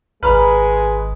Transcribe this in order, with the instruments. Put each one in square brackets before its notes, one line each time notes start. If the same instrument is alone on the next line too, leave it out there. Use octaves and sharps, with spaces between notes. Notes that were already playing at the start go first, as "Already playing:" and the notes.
[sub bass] G#1 [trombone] G#3 [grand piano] B4 [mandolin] A#5 B5 F6